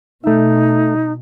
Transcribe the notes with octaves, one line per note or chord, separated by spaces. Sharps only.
B2 A3 D#4 E5